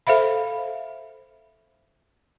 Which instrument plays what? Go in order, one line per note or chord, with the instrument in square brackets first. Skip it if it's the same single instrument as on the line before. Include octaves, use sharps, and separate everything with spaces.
[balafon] A4 C5 E5 F5 B5